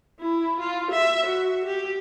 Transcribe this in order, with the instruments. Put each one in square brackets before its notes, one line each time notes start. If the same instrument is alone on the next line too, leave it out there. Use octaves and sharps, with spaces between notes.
[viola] E4
F4
E5
F#4
G4